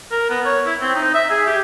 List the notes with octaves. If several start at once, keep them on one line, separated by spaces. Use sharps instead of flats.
A#4
B3
C#5
E4
C4
D#4
E5
G#4
G4